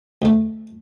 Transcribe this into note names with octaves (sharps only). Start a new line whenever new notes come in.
D2 A3